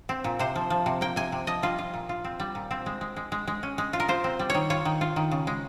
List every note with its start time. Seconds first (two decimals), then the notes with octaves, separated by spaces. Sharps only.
0.09 C4
0.24 A#2
0.39 C3 C5
0.56 F3
0.70 F3
0.86 C3
1.01 A#3 G5
1.16 C3 G#5
1.32 C3
1.47 F3 D#5
1.62 G3 F4
1.78 F4
1.94 A#2
2.09 F4
2.24 C4
2.40 G3
2.55 A#2
2.71 C4
2.86 G#3
3.01 G#3
3.16 G#3
3.32 G#3
3.47 G#3
3.63 C#4
3.78 G#3
3.93 F4
4.00 A#4
4.08 F4 C5
4.24 C4
4.39 G3
4.50 D#3 C#5
4.70 F4 C#5
4.85 D#3
5.01 F4
5.16 D#3
5.31 C#3
5.47 G#3